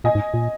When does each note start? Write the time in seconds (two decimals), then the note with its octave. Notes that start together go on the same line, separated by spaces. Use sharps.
0.04 A#2 D#5 G#5
0.15 G#2
0.34 A#2